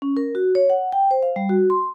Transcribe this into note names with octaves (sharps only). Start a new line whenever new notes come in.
C#4
A#4
F#4
C#5
F#5
G5
C5
F5
G3
F#4
C6